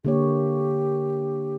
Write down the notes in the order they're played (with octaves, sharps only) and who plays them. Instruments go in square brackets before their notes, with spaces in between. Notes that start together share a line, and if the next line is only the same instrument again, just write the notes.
[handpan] D3 A#3 C#5 [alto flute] G4